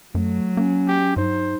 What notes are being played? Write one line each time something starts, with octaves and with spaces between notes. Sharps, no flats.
F#2 F#3 A3
A#3 C#4
G4
G2 D#4 C5